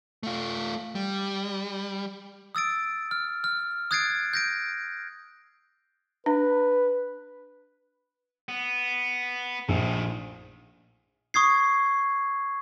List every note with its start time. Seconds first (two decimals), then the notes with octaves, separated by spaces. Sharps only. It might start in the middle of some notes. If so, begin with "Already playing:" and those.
0.23 A3 F4
0.95 G3
2.55 D#6 E6 A6 D7
3.11 F6
3.44 F6
3.91 D#6 F#6 G#6 A6 C7 D7
4.33 G6 A#6 D7
6.26 D4 B4
8.49 B3
9.69 A#1 A2 D#3
11.34 C#6 D#6 G#6 C7